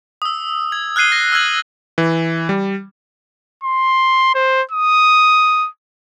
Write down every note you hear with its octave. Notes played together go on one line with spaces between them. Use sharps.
D#6 E6
G#6
F6 F#6 G#6 C7 D#7 G7
A#6
E6 F6 G#6 F#7
E3
G3
C6
C5
D#6